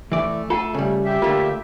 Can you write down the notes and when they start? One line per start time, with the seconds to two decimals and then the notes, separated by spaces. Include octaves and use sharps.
0.12 E3 A3 D5
0.50 F4 A4 F#5 A5
0.74 C#3 G3
1.05 G4 E5
1.22 D3 A3 A#3 F4